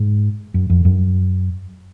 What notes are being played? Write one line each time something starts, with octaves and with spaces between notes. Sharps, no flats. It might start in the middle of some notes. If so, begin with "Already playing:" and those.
Already playing: G#2
F#2
F2
F#2